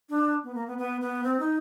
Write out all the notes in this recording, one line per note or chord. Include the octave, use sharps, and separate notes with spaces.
D4
B3
A#3
B3
B3
B3
C4
D#4